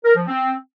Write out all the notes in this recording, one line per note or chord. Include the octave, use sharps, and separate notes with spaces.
A#4
F3
C4